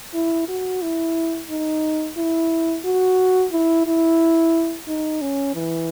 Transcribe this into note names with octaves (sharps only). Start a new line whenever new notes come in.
E4
F#4
E4
D#4
E4
F#4
E4
E4
D#4
C#4
E3